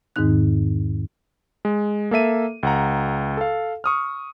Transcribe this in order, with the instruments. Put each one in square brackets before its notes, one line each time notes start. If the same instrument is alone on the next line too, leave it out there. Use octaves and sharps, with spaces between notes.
[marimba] E2 G#2 D#3 C4 D#4 F#6
[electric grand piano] G#3
A#3 A4 E5 D#7
C#2 F#5 A#5
A4 F5
C#6 D#6 F6